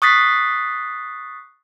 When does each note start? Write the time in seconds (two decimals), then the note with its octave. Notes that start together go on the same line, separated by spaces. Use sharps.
0.02 C#6 D#6 F#6 A6 B6 C7